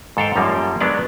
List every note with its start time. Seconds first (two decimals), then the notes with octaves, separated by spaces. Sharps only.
0.17 G#2 A4 F5 G5
0.36 F#2 F3 G3 A#3
0.81 F#3 G#3 B3 D4 D5